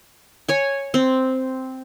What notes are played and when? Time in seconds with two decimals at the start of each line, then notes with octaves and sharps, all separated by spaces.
0.48 C#5 G#5
0.94 C4